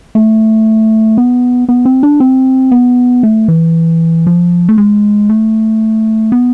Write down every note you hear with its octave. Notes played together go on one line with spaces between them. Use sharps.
A3
B3
B3
C4
D4
C4
B3
A3
E3
F3
A3
G#3
A3
B3